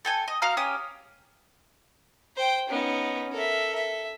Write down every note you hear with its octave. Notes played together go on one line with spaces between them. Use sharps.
A4 G5 G#5
D#5
F#4 F5 A#5 F6
C#4 G4 D#6
C5 G5
B3 C#4 D#4
A4 A#4 E5
E5